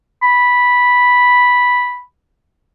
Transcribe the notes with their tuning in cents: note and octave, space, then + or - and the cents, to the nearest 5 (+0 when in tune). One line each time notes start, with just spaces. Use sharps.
B5 -5